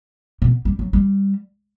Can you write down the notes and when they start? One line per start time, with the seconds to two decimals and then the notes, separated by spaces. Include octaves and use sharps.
0.42 B2
0.65 G3
0.79 F#3
0.93 G3